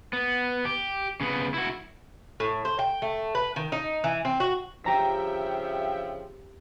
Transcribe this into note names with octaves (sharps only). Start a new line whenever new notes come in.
B3
G4
C#3 B3
E4 F#4
A2
C5
G5
A3
B4
D#3
D#4
E3
C4
F#4
G2 C#3 F3 G4 E5 G5 A#5 B6